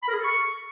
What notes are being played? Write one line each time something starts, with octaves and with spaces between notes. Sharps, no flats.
B5
A#4
G#4
A4
C#6